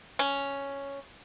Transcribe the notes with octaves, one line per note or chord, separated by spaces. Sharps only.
C#4